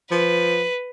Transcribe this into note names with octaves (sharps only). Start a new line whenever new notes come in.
F3 B4